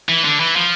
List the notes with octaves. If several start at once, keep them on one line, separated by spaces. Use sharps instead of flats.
E3
D3
E3
F3